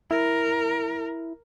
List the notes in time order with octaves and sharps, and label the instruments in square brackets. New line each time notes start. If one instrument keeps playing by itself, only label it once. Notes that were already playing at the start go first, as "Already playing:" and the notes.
[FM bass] E4 [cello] A#4